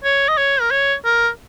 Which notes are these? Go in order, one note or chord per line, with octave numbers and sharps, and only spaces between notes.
C#5
D#5
C#5
A#4
C#5
A#4